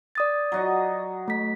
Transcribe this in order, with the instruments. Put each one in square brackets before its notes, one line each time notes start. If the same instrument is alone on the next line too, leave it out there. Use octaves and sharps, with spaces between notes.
[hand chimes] D5 D#6 A6
[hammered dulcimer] F#3 F#4 D#5
[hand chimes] A3 B6